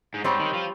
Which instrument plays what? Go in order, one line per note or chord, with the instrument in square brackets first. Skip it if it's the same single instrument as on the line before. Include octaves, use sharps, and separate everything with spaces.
[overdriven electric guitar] G#2
[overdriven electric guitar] G#2 [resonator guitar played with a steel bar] G3 C4 G4 C#5
[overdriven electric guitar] D#3
F3